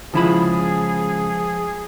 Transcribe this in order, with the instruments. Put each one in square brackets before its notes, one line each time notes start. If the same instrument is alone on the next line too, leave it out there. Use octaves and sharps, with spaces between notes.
[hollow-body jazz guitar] C#2 E4 B5 [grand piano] F3 [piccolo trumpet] G#4